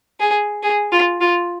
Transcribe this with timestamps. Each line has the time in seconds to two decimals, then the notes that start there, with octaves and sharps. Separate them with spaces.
0.20 G#4
0.63 G#4
0.92 F4
1.21 F4